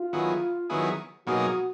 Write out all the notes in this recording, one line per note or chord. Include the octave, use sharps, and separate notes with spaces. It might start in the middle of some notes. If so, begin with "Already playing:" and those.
Already playing: F4
D#3 F#3 B3 E4 G#4
D#3 F#3 B3 E4 G#4
B2 F#3 A#3 D#4 F#4 G#4